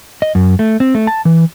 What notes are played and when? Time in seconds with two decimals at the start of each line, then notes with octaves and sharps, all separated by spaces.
0.22 D#5
0.35 F#2
0.59 A3
0.80 C4
0.95 A3
1.07 A5
1.25 E3